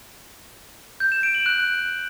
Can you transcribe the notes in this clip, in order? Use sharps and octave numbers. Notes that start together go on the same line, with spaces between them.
G6
E7
D7
F#7
F#6